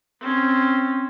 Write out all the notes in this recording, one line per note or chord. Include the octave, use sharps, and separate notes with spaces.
C4 C#4